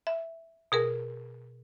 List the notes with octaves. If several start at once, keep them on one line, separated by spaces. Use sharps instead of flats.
E5
B2 G#4 A#4